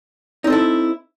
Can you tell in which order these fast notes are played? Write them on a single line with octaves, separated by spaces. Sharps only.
D#4 C4 A4 E4